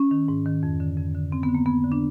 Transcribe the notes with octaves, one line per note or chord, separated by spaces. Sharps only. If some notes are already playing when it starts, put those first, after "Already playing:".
Already playing: C#4
D#3
G#2
D#3
F2
D3
F2
D3
F2 C4
B3
D3
A#3
F2 B3
D3
D4